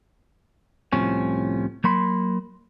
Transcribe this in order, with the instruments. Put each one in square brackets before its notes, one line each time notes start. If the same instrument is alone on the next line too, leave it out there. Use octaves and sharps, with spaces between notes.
[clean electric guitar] C2 A2 C3 F3 C#4
F#3 A#3 B5 C6